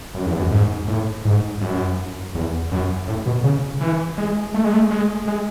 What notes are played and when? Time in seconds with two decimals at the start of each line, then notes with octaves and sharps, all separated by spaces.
0.15 F#2
0.26 E2
0.39 F#2
0.52 G#2
0.88 A2
1.25 G#2
1.61 F#2
2.35 E2
2.72 F#2
3.08 A2
3.26 B2
3.44 C#3
3.81 E3
4.18 G#3
4.54 A3
4.65 G#3
4.74 A3
4.91 G#3
5.28 G#3